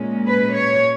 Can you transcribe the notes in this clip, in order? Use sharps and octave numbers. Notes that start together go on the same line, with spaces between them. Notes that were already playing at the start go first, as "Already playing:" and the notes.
Already playing: A#2 G#3 C#4
B4
C#5